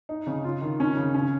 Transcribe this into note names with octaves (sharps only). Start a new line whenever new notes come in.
D#4
C#3
F4
D#3
C#4
C#3
C#4